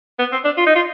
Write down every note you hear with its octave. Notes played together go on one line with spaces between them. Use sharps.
B3
C4
D4
F4
D#4
F4